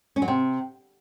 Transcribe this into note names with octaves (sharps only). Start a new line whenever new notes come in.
C#4
F#3
C3